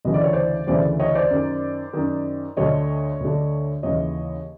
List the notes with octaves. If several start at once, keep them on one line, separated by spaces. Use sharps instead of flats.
D2 C#3 E3 D#5
D5
C#5
C5 D5
D2 C#3 E3 C5 D5
C#5 D#5
C5 D5
F#2 D#3
F#2 D#3
D2 D3 C#5 D#5
D2 D3
D#2 C#3 E3 C#5 D#5